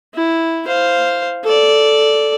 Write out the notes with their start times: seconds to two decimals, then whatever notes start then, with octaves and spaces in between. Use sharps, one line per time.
0.14 E4
0.67 C5 F5
1.44 A4 D5